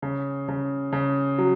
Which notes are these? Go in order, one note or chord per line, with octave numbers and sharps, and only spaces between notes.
C#3
C#3
C#3
F#3